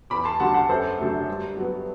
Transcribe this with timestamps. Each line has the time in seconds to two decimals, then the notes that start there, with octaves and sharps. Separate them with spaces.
0.10 E2 B5 D6
0.25 A5 C6
0.40 D3 F#3 F#5 A5
0.54 F#5 A5
0.69 F#2 A4 C5
0.98 D3 F#3 A3
1.28 G2
1.57 F#3 B3